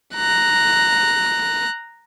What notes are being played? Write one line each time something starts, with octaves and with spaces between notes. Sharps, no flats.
A#5 F#6